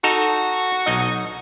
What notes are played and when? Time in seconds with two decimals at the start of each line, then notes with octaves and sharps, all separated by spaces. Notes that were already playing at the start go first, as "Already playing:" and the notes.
0.04 D#4 F#4 A4 A#5
0.86 B1 D#4 D#5